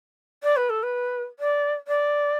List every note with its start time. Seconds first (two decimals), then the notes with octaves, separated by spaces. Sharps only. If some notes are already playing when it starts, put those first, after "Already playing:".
0.43 D5
0.56 B4
0.69 A4
0.83 B4
1.39 D5
1.87 D5